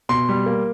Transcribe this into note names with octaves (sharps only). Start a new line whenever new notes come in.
B2 C6
G3
A#3